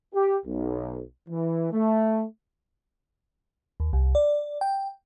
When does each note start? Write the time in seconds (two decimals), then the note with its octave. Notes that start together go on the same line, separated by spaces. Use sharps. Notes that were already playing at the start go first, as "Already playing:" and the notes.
0.14 G4
0.45 B1
1.29 E3
1.72 A3
3.80 D#2
3.93 C2
4.15 D5
4.61 G5